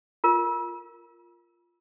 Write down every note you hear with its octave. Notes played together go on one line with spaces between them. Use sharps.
F4 A#4